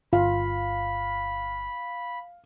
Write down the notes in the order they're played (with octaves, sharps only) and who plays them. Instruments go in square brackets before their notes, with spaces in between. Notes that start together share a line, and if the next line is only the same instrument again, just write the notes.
[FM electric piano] G1 [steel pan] F4 [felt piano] F5 [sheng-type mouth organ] B5